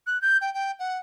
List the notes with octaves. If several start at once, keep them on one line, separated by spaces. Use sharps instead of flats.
F#6
G6
G5
G5
F#5